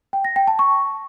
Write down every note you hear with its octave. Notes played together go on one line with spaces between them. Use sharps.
G5
A#6
G5
A5
C#6